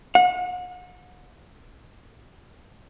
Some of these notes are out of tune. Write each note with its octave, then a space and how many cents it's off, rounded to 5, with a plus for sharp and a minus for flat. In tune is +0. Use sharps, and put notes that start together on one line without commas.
F#5 -35